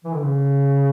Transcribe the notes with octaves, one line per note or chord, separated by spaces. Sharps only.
E3
D3
C#3